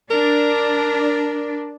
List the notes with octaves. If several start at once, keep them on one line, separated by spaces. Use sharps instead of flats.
D4 A#4